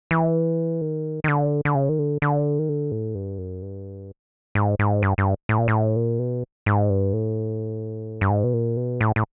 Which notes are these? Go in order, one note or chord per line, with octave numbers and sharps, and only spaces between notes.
E3
D#3
D#3
D3
D3
C#3
D#3
D3
D3
D#3
D3
A2
G2
F#2
G2
G#2
G#2
G2
G2
A2
A#2
A2
A#2
B2
G#2
G2
A2
G2
G#2
B2
A#2
B2
A2
A2